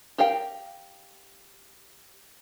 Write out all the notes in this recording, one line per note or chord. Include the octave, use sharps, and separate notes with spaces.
G4 A#4 F5 G5